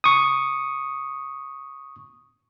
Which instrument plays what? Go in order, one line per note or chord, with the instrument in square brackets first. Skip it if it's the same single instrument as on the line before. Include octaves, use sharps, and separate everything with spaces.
[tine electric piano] C#6 D#6